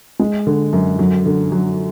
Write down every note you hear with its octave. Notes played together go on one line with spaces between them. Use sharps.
G#3
D3
F#2
F#3
D3
F#3